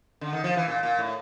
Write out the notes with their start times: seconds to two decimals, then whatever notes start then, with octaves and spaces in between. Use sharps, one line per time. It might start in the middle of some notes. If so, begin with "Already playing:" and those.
0.21 D3
0.33 D#3
0.44 F3
0.56 E3
0.68 A#2
0.83 A#2
0.99 A2